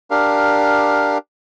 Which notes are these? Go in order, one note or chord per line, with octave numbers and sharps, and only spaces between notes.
D4 G4 A#4 F5